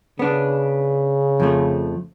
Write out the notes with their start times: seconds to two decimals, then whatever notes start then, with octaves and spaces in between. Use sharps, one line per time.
0.19 C#3 B3 D4
1.40 F2 F3 A3